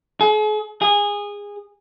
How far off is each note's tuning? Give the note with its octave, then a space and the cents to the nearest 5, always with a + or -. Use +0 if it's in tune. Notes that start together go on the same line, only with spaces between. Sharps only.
G#4 +45
G#4 -20